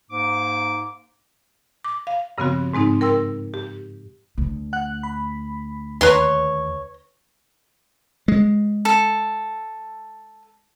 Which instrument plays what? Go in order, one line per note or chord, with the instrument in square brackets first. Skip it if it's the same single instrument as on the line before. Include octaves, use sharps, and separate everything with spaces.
[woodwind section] G#2 A#3 D6
[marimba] D6
F5
G2 C#3 F3 B3 C4 F#4
G#2 G#3 C4 D#4
A#4 G5 C6 E6
G4
[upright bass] D2
[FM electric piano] F#5 F#6
B5
[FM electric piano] D#2 [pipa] B4 A#5 C6 [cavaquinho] C#5
[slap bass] G#3
[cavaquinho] A4